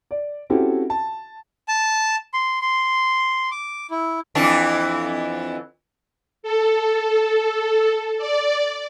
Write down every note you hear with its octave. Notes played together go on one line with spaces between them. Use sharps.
D5
C4 C#4 E4 F#4 G4 A4
A5
A5
C6
C6
D6
E4
F2 E3 D4
A4
D5